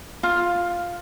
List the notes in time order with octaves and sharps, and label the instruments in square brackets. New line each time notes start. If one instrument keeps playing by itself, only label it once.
[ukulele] F4